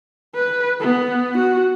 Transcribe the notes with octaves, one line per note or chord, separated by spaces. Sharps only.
B4
B3
F#4